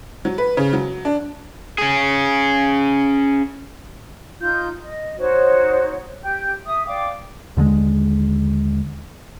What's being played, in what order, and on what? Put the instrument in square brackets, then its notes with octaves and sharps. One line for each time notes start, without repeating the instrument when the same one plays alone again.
[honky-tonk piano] F#3
B4
C#3
F#3
D4
[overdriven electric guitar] C#4 G#4
[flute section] D#4 F4 G6
D#5
D#4 F#4 C5 C#5
G4 G5 G6
E5 D#6
D5 F5 G5 D6
[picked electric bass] D#2 D3 F3 G#3